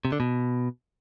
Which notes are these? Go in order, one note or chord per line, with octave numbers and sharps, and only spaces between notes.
C3
D3
B2